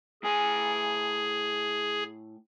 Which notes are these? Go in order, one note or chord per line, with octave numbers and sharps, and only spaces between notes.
A2 G#4 G#5